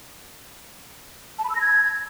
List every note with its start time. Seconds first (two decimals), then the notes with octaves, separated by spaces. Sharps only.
1.39 A5
1.44 B5
1.50 E6
1.55 A#6
1.61 G#6